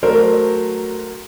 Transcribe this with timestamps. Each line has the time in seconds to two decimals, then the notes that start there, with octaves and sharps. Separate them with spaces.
0.03 F#3 A3 A#4 C5